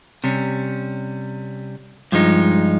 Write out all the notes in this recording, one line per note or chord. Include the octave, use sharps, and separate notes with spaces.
C3 G3 C#4
G2 F3 G#3 D#4